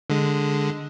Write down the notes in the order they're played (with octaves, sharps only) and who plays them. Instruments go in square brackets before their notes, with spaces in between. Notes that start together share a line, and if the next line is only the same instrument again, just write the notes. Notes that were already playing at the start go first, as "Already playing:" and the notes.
[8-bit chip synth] D3 G#3